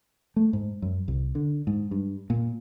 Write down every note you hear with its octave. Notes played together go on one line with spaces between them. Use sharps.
A3
G#2
F#2
C2
D3
G#2
G2
A#2